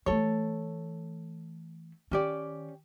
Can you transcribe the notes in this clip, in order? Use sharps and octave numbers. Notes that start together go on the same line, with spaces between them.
E3 A3 A4 C#5
D#3 C#4 G4 D5